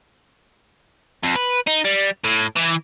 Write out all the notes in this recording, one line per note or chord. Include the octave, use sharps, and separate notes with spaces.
F2
B4
D#4
G3
A2
E3